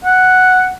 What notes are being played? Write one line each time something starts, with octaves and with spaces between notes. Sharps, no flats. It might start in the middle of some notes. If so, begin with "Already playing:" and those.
F#5